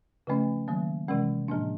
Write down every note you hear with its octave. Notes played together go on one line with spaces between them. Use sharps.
C#3 F3 A3 C#4
D#3 F#3 A#3
C3 E3 G#3 C#4
A2 F3 A#3 D4